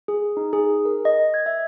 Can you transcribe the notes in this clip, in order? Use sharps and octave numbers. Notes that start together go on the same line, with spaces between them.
G#4
D#4
G#4
A#4
D#5
G#6
E5